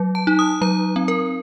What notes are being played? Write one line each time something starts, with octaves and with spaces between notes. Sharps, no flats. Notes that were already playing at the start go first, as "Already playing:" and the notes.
Already playing: F#3
A5
D#4
D#6
F#3 A#5
C4
A#4